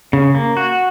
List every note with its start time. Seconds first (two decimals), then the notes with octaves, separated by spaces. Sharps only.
0.13 C#3
0.35 A#3
0.57 F#4